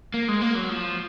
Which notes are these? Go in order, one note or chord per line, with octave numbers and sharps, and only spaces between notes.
A#3
G#3
A#3
F#3
F3